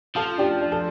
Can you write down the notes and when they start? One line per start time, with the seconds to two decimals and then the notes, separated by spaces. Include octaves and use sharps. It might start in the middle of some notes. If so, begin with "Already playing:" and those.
0.16 F3 F4 A4
0.38 D4 G4
0.61 D4
0.72 A4